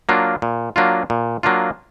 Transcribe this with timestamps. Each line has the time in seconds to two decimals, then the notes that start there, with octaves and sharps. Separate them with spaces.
0.09 F#3 A#3 D4 F4
0.42 A#2
0.76 F#3 A#3 D4 F4
1.10 A#2
1.43 F#3 A#3 D4 F4